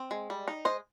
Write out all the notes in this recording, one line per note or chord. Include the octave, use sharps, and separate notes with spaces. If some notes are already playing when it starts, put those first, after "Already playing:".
Already playing: C4
G#3
G3
D#4
G#3 C5 D#5